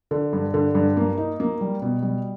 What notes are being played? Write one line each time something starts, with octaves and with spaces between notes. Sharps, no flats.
D3
G2
D3
G2
A#3
D#4
A#3
G3
B2
G3